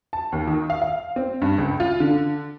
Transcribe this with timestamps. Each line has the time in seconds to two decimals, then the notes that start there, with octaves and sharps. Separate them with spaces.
0.13 A5
0.32 D#2
0.47 D#3
0.70 F5
0.82 F5
1.16 C4
1.42 G2
1.58 C#2
1.80 F4
2.00 D3